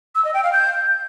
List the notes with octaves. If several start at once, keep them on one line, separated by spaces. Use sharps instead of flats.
E6
D#5
G5
F5
G6